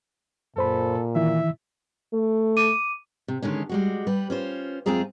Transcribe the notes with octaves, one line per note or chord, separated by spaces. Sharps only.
F#2 A#2 A4 C5 B5
D#3 E3 E4 E5
A3
D6 D#7
C3
D3 D#3 G#3 C#4
G3 G#3 F#4
G3 B4
C#4 F4 C5
F#2 G#3 C4 F4 G#4 A#5